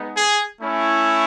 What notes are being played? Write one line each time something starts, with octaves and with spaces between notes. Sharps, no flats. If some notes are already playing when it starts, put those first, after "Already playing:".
Already playing: G#3 B3 D#4
G#4
A3 C#4 E4